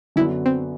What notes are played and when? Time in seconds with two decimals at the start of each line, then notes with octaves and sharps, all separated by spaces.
0.16 F#2 D3 F#3 B3 E4
0.46 C4